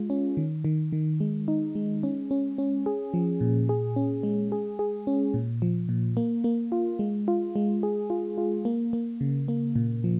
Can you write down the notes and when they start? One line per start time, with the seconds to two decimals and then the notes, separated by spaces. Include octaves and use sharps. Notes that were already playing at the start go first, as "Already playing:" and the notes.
Already playing: G#3 F4
0.10 C#4
0.37 D#3
0.65 D#3
0.93 D#3
1.20 G#3
1.48 D#4
1.75 G#3
2.03 C#4
2.31 C#4
2.58 C#4
2.86 G#4
3.14 F3
3.41 A#2
3.69 G#4
3.96 C#4
4.23 G#3
4.52 G#4
4.79 G#4
5.07 C#4
5.34 A#2
5.62 F3
5.89 A#2
6.17 A#3
6.44 A#3
6.72 F4
6.99 G#3
7.28 F4
7.56 G#3
7.83 G#4
8.10 F4
8.38 F4
8.65 A#3
8.93 A#3
9.21 C#3
9.48 A#3
9.76 A#2
10.04 F3